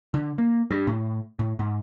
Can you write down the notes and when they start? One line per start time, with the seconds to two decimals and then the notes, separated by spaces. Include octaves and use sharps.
0.14 D3
0.38 A#3
0.71 G2
0.87 A2
1.39 A2
1.59 G#2